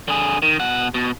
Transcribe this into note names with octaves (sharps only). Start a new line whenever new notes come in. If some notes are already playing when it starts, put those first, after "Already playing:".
D3 G#4
D#3
B2 F#5
B2